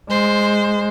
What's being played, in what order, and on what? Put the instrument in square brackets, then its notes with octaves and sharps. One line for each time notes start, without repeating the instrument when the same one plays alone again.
[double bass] G#3 [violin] C5